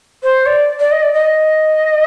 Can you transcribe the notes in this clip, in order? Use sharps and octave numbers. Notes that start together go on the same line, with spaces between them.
C5
D5
D5
D#5
D5
D#5